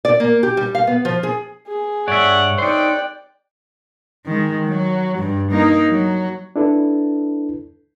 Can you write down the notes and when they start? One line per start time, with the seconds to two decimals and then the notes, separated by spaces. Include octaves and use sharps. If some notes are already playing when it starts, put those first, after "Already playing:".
0.05 D5
0.20 A#3
0.43 G4
0.57 G3
0.75 F5
0.87 B3
1.05 F3
1.23 G#4
1.67 G#4
2.08 G2 C#5 D5 E5 F#5
2.58 D#4 C5 D5 G5 F#6
4.26 D#3 G#3
4.66 F#3
5.19 G2
5.52 A#3 D#4
5.88 F#3
6.56 D4 E4 A4 B4